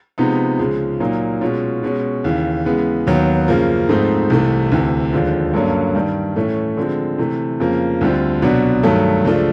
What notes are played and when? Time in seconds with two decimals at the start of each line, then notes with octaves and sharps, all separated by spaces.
0.18 C3 F3 G#3 B3 D#4
0.59 C#2 C#3 F3 G#3
1.00 A#2 F#3 A#3 D#4
1.41 B2 G#3 C#4 F4
1.83 B2 G#3 C#4
2.24 D#2 C#3 E3
2.65 C#3 E3 G#3 B3
3.07 D#2 D#3 F#3 B3
3.48 F#2 C#3 F3 A#3
3.89 G#2 F3 A3 C4 D#4
4.30 C2 C3 E3 A3
4.72 D2 C3 E3
5.13 D#2 D3 F3 G#3
5.53 G2 D3 F#3 A#3 C#4
5.95 G2 D#3 G3
6.36 A2 E3 A3 C#4
6.77 D3 F3 G#3 C4
7.18 C3 E3 A3
7.60 F2 C#3 F3 A#3
8.01 D2 D3 G3 C4 F4
8.42 C2 B2 F#3 B3 D4
8.83 G2 D#3 F#3 A3
9.24 C#2 C#3 F3 A3 D4